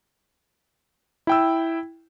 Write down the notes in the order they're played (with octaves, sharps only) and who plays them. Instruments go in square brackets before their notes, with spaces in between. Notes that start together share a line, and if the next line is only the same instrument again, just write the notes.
[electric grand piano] E4 G5 E6